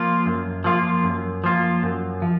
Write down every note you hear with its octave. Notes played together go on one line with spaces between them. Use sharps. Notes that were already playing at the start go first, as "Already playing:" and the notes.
Already playing: F3 A#3 F4
F#2
F3 A#3 F4
F#2
F3 A#3 F4
F#2
F3